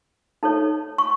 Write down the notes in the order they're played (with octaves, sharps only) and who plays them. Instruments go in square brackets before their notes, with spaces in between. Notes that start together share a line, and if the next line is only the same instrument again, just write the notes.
[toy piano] D#4 A4 C#5
C#6